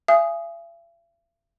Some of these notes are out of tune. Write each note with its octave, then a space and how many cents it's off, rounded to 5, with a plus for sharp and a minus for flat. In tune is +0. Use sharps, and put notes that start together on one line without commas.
E5 +45 G#5 +0 D#6 +0